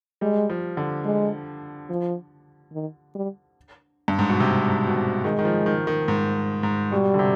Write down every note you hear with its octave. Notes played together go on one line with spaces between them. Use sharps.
G3 G#3
F3
D3
G#3
F3
D#3
G3
G2
G#2
B2
C3
G#2
B2
C3
D#3 G#3
D#3
F3
D#3
D#3
G#2
G#2
B2 G3
D3
C3